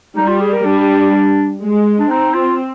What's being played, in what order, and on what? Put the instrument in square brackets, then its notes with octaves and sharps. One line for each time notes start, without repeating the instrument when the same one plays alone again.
[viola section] G3 [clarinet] D#4
[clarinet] F4
G#4
A#4
[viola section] G3 [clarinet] D4
[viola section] G#3
[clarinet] D4
[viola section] C4 [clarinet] D#4
[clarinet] F4